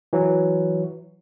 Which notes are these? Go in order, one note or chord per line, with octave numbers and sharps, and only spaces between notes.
E3 F#3